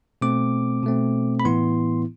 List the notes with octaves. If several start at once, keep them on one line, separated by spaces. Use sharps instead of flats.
B2 A3 C4 D6
B2 A3 C4
B5
A2 E3 B3 E4 C6